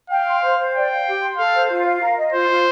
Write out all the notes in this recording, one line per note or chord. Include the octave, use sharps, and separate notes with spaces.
F5 G5
C6
C5
C5
D5 G5
F5
G4
C6
A4 F5
C5
F4
F5
A#4
D#5
F4 C5
F4